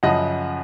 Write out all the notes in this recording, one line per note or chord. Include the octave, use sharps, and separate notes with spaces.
F#2 C#3 F3 D#5 F#5